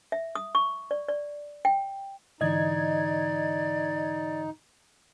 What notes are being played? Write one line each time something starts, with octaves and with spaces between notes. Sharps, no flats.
E5
D#6
C#6
D5
D5
G5
G#2 D3 E3 D#4 D5 D#5 G#6